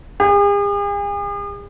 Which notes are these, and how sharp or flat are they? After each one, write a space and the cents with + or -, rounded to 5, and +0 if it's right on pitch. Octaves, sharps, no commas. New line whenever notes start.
G#4 -45